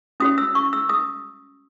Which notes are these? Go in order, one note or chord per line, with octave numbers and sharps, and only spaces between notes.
C#4 F#4 C#5 D#6
E6
C#6
E6
D#6